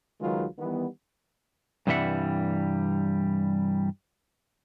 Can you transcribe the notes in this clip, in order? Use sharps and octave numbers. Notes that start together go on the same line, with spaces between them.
C#2 D#3 F#3 G#3 F4 B4
D#3 E3 G3 B3
G2 C3 E3 G3 E5 F#5